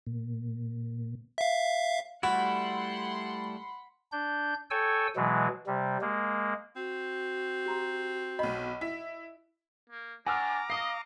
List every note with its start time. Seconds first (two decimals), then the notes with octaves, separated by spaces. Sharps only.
0.07 A#2
1.38 E5 F5
2.23 G3 A3 E4 F#4 F#5 B5 C6
4.12 D4 G6
4.71 A4 C#5 G5 G#5 E6
5.16 B2 E3 F#3 G#3
5.67 C3 G3
6.01 G#3 A#3
6.76 C4 F#4
7.66 G4 A#5 C6
8.39 B1 D#5 B5
8.81 E4 B6
9.89 A#3
10.27 D4 F#5 G#5 A#5 C#6 D6 E6 F6
10.70 D#5 F5 D#6 C7